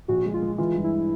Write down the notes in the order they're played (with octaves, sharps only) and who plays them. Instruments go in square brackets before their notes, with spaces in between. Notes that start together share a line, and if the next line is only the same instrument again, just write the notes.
[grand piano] A#1 [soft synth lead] F#4
[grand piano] G#3
[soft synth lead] F4
[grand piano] G#3
[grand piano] E3 [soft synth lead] F4
[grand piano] G2
[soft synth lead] E4